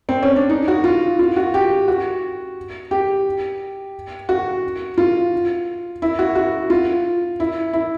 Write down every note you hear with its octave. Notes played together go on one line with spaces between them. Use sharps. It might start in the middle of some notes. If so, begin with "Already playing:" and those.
C4
C#4
D4
D#4
F#4
F4
F4
F#4
G4
F#4
G4
F#4
F4
E4
F#4
F#4
F4
E4
E4